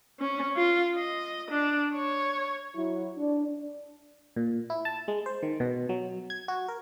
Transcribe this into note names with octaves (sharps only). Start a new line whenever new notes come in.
C#4
F4
D#5
D4
C#5
F#3 E4
D4
A#2
E4
A5
G#3
C5
D#3
B2
F#3
G#6
F#4
A#4